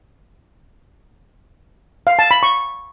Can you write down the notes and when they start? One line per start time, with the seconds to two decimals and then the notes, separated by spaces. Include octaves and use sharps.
2.07 F5
2.19 A5
2.31 B5
2.43 C#6